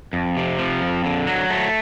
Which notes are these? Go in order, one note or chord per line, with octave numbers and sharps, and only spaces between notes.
F2
C3
F3
F2
D3
F#3
A3